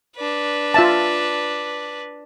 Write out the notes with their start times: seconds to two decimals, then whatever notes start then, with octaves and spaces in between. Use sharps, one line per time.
0.16 D4 B4
0.74 F4 E5 A5